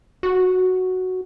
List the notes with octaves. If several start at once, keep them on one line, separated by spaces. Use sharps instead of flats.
F#4